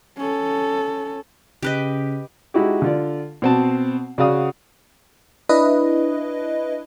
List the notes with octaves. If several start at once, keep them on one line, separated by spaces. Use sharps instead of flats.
C#4 A4
C#3 G4 B4 D#5
G#3 D#4 E4 F#4 G4
D3 F4 D5
B2 C4 A5
C#3 F#4 D5 F5 F#5 D#6
D4 E4 B4 D#5